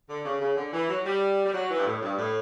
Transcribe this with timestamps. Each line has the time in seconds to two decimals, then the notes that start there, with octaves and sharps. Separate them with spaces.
0.09 D3
0.25 C#3
0.41 C#3
0.57 D3
0.73 E3
0.89 F#3
1.06 G3
1.46 G3
1.54 F#3
1.70 E3
1.78 G2
1.86 A2
2.02 G2
2.18 A2